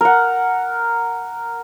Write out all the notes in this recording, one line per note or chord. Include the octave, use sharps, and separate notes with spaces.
A#4 F#5